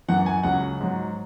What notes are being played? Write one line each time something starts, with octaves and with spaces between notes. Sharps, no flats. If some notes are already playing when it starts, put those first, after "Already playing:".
F#2 E3 F#5
G#5
C#2 C#3 F#3 F#5
G#2 F#3